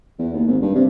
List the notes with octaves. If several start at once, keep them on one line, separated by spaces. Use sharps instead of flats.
E2
D#2
G#1
G2
C3